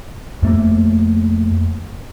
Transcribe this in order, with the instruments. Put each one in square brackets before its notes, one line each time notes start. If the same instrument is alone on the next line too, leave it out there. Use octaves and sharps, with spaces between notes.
[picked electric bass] F2 A3 A#3